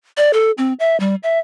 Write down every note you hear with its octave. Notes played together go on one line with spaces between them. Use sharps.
D5
A4
C4
E5
G3
E5